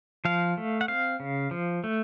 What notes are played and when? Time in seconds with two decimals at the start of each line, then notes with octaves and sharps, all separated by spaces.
0.25 F3 F5
0.57 A3
0.81 F#5
0.88 C4 F5
1.20 C#3
1.51 F3
1.84 A3